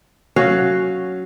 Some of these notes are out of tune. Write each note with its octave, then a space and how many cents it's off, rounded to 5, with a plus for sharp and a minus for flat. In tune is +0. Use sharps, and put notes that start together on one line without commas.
F#3 +0 C#4 +0 F5 +0